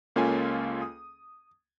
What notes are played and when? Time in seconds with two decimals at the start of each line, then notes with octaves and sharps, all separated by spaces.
0.16 C#2 A#3 C#4 F4 A4 G#5
0.82 D#6